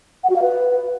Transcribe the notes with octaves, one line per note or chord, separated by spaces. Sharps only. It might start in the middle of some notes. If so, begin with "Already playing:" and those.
F#5
F#4
F5
B4